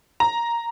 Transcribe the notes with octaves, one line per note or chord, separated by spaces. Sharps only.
A#5